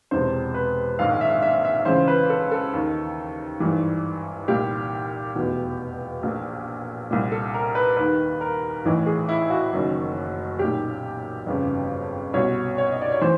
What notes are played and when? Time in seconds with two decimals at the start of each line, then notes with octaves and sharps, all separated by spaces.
0.11 E1 E2 C3 C5
0.54 B4
0.99 A#1 G#2 D#3 F5
1.21 E5
1.42 E5
1.65 E5
1.85 C#2 C#3 E3 C5
2.08 B4
2.29 A4
2.51 A4
2.73 D#2 D#3
3.60 G#1 G2 E3
4.48 C2 A#2 G4
5.35 F1 E2 B2
6.23 A#1 A#2
7.11 C2 A#2
7.32 A4
7.54 A#4
7.75 B4
7.97 D#2 D#3 B4
8.41 A#4
8.85 A1 A2 E3
9.06 G#4
9.29 E4
9.50 F#4
9.72 F#1 F#2 D#3
10.59 B1 A#2 G4
11.46 G1 F2 C#3
12.33 C2 B2 C#5
12.78 C#5
12.92 D#5
13.02 D5
13.12 C#5
13.22 E3 C5